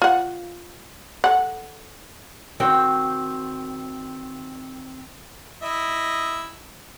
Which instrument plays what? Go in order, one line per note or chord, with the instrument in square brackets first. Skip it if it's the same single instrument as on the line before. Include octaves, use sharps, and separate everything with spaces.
[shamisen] F4 F#5
A4 F#5
[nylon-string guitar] D#3 C4 F#4 G5
[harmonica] E4 D#5 E5